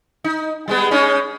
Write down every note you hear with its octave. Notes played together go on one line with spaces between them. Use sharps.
D#4
G3 G#3 B3
G#3 C#4 D#4